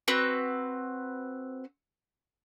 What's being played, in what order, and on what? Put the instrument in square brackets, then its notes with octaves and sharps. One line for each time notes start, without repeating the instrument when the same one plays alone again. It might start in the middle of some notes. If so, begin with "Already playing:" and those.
[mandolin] C4 F#4 B4 E6